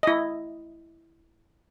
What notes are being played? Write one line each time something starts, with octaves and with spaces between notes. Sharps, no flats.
E4 D#5